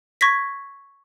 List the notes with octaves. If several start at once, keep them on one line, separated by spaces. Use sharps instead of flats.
C#6 G#6 A#6 B6